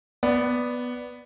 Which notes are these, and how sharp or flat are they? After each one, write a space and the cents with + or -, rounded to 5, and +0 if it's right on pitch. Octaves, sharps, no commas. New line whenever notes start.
B3 +0 D5 +0 F#5 +30